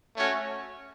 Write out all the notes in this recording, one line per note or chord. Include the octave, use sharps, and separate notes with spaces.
A3 C#4 F#4 C#5